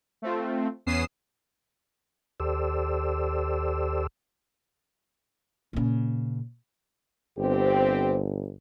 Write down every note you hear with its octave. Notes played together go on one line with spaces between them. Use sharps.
A3 C4 F4
E2 B3 C#4 D#6 C7 E7
D#2 G4 A4 C5 D5 E6
A#2 C#3
G1 C4 G4